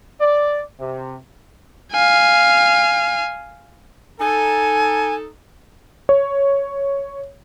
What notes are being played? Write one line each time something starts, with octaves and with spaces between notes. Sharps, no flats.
D5
C3
F5 G#5
D#4 A4 G#5
C#5